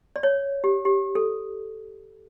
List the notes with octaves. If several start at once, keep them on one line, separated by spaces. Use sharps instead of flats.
D5
C#5
G4
G4
A4